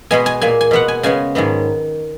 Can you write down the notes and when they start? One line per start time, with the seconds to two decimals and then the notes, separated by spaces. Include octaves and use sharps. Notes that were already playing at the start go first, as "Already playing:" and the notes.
0.11 B2 G#3 B3 G#5
0.26 G#5
0.41 A#2 A#3 G#5
0.61 G#5
0.71 B2 G#3 B3 F#5
0.88 G#5
1.03 C#3 G#3 B3 G#5
1.35 G#2 D#3 F#3 B3